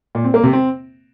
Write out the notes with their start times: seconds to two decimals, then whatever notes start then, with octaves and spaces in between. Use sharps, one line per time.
0.15 A#2
0.24 C4
0.34 A#3
0.43 C3
0.53 C4